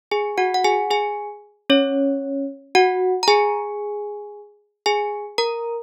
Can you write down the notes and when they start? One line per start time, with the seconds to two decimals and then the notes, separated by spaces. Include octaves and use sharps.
0.11 G#4 G#5
0.38 F#4 F#5
0.54 F#5
0.64 G#4 G#5
0.91 G#4 G#5
1.70 C#4 C#5
2.75 F#4 F#5
3.23 A#5
3.28 G#4 G#5
4.86 G#4 G#5
5.38 A#4 A#5